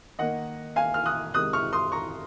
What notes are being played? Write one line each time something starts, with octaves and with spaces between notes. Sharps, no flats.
D#3 A#3 D#5 F#5
F5 G#5
F6
D#6 F#6
C3 D#3 G#3 D#6 F#6
C#6 F6
C6 D#6
A#5 C#6